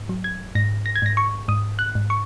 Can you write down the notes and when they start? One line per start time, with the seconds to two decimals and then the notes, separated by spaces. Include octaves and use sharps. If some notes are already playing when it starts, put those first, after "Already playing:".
Already playing: G#2
0.09 F#3
0.24 G#6
0.55 G#2 A#6
0.86 A#6
0.96 G#6
1.02 G#2 A#6
1.17 C#6
1.48 G#2 D#6
1.79 F#6
1.95 G#2
2.10 C#6